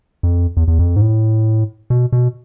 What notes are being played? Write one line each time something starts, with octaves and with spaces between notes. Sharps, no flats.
F2
E2
E2
F2
G#2
A2
B2
B2